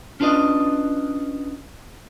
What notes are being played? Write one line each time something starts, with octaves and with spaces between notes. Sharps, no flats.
C#4 D4 F4 B4 D5 D#5